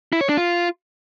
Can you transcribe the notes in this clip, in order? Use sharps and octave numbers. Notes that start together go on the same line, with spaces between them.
E4
C#5
D4
F4